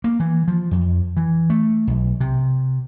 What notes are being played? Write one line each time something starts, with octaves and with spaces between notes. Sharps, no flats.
A#3
E3
F3
F2
E3
A3
B1
C3